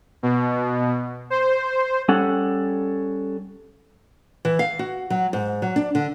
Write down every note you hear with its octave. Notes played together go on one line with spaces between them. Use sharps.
B2
C5
G3 C#4 A4 F#5
E3
F5
F#4
F#3
G#2
F#3
D4
D3